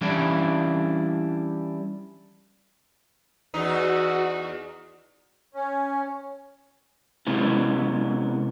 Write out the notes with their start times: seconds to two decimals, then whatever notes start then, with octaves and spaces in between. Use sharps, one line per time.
0.01 E3 G3 C#4 D4 E4
3.54 E2 D#4 F#4
5.54 C#4
7.27 C3 G#3 B3 C#4 E4